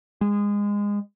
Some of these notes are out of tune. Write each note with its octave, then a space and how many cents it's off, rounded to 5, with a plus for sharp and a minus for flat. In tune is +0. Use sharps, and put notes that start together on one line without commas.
G#3 -20